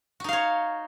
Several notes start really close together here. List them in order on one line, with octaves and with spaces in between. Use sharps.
F#4 D#4 F5 C#5